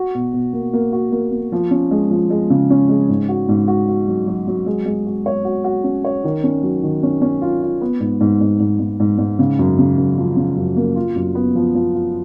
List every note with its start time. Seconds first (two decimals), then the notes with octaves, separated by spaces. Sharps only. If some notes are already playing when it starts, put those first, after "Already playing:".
Already playing: F#4
0.15 B2
0.33 B2
0.53 A#3
0.73 A#3
0.92 F#4
1.12 A#3
1.31 A#3
1.52 F3
1.71 C#4
1.91 G#3
2.11 F3
2.30 G#3
2.50 C#3
2.70 C#4
2.89 G#3
3.09 G#2
3.29 F#4
3.49 G#2
3.68 F#4
3.88 F#4
4.08 F#3
4.27 F#3
4.47 F#3
4.66 G#3
4.86 G#3
5.06 F#4
5.26 C#5
5.45 F#4
5.64 F#4
5.84 C#4
6.04 C#5
6.24 D#3
6.44 C#4
6.63 F#3
6.83 D#3
7.03 C#4
7.22 C#4
7.41 F4
7.62 F4
7.81 B3
8.00 G#2
8.21 G#2
8.41 G#2
8.60 G#2
8.80 G#2
9.00 G#2
9.18 G#2
9.39 C#3
9.59 F#2
9.79 C#3
9.97 F#2
10.18 F3
10.37 C#3
10.56 F#2
10.76 A#3
10.96 F4
11.15 F#2
11.35 B3
11.55 F3
11.75 F3
11.94 F4